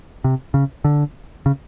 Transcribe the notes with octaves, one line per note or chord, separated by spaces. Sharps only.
C3
C#3
D3
C#3